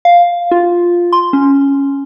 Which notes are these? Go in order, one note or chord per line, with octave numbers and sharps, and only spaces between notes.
F5
F4
C6
C#4